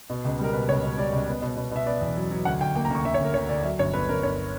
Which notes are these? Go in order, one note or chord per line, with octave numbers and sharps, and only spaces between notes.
B2
C#2
G3 A#4
B2 B4
C#2 C#5
B2
G3 D5
C#2
B3
B2
B2
B2 E5
B3 D5
E2
F#3
F#3
D2 F#5
D2 G5
A#3 G5
A#5
D2 C#6
D2 E5
C#5
D2 A#4
D2 C#5
D2 D5
F#3 E5
G1 C#5
G1 B4
G1 A#4
G1 C#5